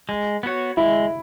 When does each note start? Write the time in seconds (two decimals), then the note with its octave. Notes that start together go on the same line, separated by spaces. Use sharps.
0.09 G#3
0.43 B3 F#4 C#5
0.77 G#3 E4